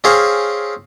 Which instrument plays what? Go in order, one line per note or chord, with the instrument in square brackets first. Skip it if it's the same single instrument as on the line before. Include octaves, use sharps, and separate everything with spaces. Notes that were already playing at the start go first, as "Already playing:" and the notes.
[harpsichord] C4 C#4 G#4 F5